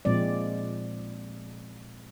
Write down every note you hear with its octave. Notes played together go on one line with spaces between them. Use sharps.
A#2 F3 G#3 C4 D5